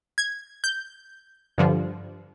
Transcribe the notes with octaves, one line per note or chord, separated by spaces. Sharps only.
G#6
G6
G2 D3 F3